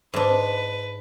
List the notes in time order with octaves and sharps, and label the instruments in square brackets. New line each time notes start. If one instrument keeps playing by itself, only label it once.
[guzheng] G#2 D4 [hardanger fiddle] B4